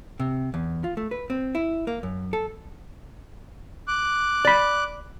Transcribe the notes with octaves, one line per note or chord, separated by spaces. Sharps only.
C3
E2
F4
A3
B4
C4
E4
A#3
F#2
A4
D6 F#6
D5 B5